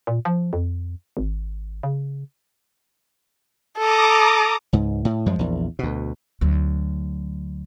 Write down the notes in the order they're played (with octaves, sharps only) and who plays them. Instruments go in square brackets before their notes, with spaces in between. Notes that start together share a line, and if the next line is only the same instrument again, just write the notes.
[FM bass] A#2
F3
F2
G#1
C#3
[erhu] A4 [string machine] A#5 D6 D#6
[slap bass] C#2 G#2
A2
F#2 F3 G#3
A#1 E2
D2 B2
[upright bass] D2 F#3